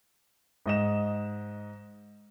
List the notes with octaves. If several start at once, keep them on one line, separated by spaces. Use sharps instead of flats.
G#2 D#5 E7